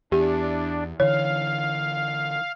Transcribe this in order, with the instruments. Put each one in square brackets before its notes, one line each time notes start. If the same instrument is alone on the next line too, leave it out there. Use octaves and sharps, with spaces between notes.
[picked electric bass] E2 [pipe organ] D4 [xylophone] G4
[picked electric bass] D3 E3 [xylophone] C#5 [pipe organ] F5